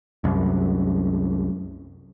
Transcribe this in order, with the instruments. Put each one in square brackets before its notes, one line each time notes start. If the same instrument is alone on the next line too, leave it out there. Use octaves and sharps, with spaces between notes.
[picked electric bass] C2 F#2